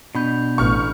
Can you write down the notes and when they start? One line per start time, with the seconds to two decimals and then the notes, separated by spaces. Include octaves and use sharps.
0.15 B2 D4 B5 G6
0.58 A1 C#6 F6